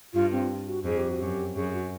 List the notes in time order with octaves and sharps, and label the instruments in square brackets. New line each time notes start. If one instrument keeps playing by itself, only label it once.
[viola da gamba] G2 [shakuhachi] F4
[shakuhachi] C4
F#4
[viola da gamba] F2 [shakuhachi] G#4
[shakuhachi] G4
F#4
[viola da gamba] F#2 [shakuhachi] G4
[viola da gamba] F#2 [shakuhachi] G#4
[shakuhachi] F#4